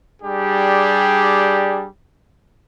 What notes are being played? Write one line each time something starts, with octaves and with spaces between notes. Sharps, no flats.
G3 D4 G4 G#4